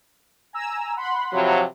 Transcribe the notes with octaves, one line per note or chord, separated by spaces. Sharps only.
G#5 A#5 E6
F#5 B5 C6
C3 F3 F#3